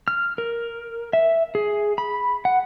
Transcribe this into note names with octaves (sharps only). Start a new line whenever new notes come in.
F6
A#4
E5
G#4
B5
F#5